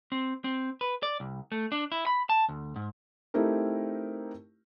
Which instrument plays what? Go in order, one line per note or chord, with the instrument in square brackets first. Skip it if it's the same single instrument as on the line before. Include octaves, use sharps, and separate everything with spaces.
[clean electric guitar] C4
C4
B4
D5
C2
A3
D4
E4
B5
A5
D2
G#2
[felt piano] A3 C4 D#4 E4 G4 A#4